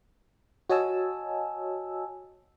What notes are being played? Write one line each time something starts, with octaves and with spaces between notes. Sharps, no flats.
F#4 C#5 D#5 G#5 A5 E6